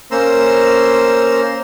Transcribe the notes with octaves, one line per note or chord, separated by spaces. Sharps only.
A#3 C#4 C5 A#5 C6 E6